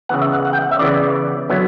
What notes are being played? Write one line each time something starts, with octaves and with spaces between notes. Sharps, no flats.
C#3 E3 B3 F#5
E5
F#5
F#5
G5
F#5
E5
C#3 E3 B3 D5
D3 F#3 B3 E4